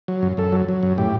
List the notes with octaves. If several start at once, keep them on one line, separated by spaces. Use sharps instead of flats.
F#3
F#2
F#2 A4
F#3
F#3
F#2
A2 G4